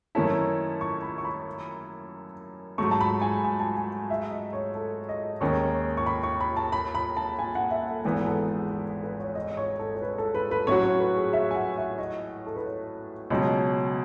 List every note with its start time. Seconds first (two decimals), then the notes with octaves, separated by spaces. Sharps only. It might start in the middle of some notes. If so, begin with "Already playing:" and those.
0.15 F#2 D#3 A3 C#4 E4 A5
0.81 C#6
1.02 B5
1.18 C#6
1.25 B5
2.78 G#2 F#3 A3 C#6
2.91 A5
3.01 B5
3.21 G#5
3.44 G#5
3.60 A5
3.76 G#5
4.10 E5
4.31 D#5
4.53 C#5
4.75 A4
5.09 D#5
5.41 D#2 D#3 G#3 C#4 C#6
5.97 C#6
6.06 B5
6.23 C#6
6.40 B5
6.57 A5
6.72 B5
6.95 B5
7.17 A5
7.39 G#5
7.55 F#5
7.71 E5
7.88 A4
8.04 G#1 G#2 E3 B3 G#4
8.15 B4
8.27 A4
8.48 G#4
8.71 A4
9.03 B4
9.19 C#5
9.35 D#5
9.57 C#5
9.79 A4
9.94 C#5
10.02 B4
10.18 A4
10.35 B4
10.51 B4
10.67 A2 F#3 C#4 F#4 C#5
10.83 C#5
11.00 B4
11.17 G#4
11.33 E5
11.51 G#5
11.55 F#5
11.77 E5
11.98 D#5
12.46 A4
12.56 B4
12.65 C#5
13.30 C#2 B2 F#3 C#4 D#5